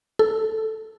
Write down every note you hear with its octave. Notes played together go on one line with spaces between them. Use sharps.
A4